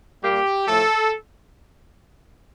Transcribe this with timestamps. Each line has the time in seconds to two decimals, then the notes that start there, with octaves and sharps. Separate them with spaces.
0.23 A#2 G3 A#3 G4
0.67 A2 F3 A3 A4